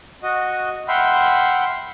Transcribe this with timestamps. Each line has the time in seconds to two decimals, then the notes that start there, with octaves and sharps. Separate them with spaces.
0.23 F#4 D#5
0.88 E5 F#5 G5 B5 C6 F6